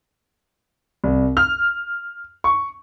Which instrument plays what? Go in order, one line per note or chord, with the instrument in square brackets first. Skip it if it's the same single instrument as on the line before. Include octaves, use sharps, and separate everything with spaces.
[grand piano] C2
F6
C#6